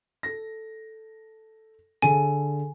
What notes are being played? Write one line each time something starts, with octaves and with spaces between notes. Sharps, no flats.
A4 A#6
D3 G#4 A4 G#5